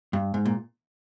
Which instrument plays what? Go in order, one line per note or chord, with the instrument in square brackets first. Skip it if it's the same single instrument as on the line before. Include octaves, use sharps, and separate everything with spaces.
[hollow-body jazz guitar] G2
G#2
A#2